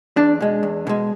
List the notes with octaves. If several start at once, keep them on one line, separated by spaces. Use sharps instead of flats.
E2 D4 D5
B2 G#3
E2
B2 G#3